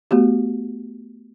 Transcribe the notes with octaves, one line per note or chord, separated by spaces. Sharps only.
A3 B3 F#4 G4